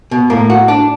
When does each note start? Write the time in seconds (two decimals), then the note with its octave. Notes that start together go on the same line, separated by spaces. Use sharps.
0.11 B2
0.30 A2 A#3
0.50 F#4
0.68 D4